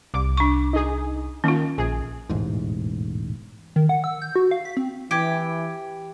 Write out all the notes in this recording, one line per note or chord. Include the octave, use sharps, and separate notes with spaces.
C2 D6
D4 C#6
D#4 G#4
D#3 A#3 C#4 F4
A#1 G#4
E1 A1 G#2
D#3
F#5
E6
G6
F#4
F5
B6
C4
E3 G4 D6 G#6 D7